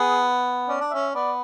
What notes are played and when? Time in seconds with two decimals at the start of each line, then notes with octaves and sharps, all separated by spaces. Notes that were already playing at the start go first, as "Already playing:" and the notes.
Already playing: B3 G#4
0.68 C#4 D5
0.81 D4
0.91 C#4 E5
1.15 B3 D5